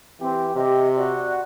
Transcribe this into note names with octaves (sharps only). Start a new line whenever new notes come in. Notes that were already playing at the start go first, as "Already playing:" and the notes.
E3 C4 G4
C3 G4 D#5
F#4 D5